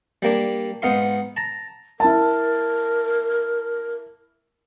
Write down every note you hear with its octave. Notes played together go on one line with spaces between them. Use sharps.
G3 A#3 D4
G#2 B3 D#4 F5 C6
A5 A#5
E4 A#4 A5